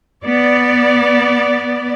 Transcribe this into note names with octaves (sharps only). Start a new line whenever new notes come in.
B3 D5